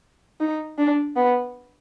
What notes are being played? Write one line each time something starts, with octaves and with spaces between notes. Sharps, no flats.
D#4
D4
B3